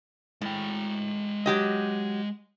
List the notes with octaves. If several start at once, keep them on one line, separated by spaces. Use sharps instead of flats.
A2 G#3 G5
F#3 G4 D#5